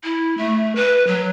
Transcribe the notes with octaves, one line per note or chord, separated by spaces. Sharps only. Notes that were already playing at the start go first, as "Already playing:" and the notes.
E4
A3
B4
F#3